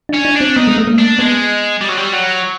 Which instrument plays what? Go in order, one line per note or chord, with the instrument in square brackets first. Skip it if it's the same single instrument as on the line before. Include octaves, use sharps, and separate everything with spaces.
[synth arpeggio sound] D4
[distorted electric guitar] C#4
[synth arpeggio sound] D4
[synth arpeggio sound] C4 [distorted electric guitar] D4
[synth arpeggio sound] B3 [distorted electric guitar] D#4
[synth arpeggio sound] G#3
A3
A#3
[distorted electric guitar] D4
[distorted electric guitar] G#3 [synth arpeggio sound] B3
[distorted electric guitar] G3
F#3
G3
F#3